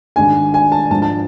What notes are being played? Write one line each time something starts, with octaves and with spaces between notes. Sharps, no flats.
G#1 G#2 G#3 D4 G#5
G#5
A5
G#2 F3 G#3 D4 A5
A5